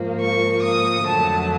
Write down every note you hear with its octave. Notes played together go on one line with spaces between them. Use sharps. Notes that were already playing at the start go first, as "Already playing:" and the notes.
Already playing: G#2 F3 A#3
C#6
D#6
F2 D3 F#3 A3 A5